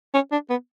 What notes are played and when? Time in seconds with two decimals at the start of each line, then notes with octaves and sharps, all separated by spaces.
0.14 C#4
0.32 D4
0.50 B3